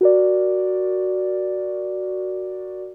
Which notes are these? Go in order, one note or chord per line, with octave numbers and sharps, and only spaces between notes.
F#4 A#4 D5